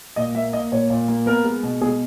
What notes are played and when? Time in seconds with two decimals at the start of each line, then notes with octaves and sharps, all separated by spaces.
0.16 A#2 D#5
0.35 A#3 E5
0.53 A#3 D#5
0.72 A#2 C#5
0.90 A#2
1.08 A#3
1.26 B3 A#4
1.44 G#3
1.63 B2
1.81 B2 G#4